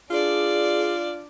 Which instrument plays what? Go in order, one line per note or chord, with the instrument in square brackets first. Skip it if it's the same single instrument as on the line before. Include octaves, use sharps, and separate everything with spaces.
[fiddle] D4 D5 [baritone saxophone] F4 [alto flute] G#4